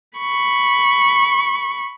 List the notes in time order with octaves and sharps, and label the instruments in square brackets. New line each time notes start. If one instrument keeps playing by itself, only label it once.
[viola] B5 C#6